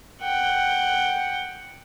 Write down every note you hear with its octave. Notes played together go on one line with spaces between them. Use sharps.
F#5 G5